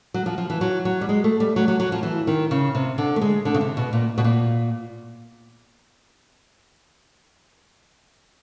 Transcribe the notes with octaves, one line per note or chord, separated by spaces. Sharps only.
F#3
F3
F3
E3
F#3
F#3
G3
G#3
A3
G3
F#3
F#3
F#3
F3
E3
D#3
C#3
C3
D3
A3
G#3
D3
C#3
C3
B2
A#2
B2
A#2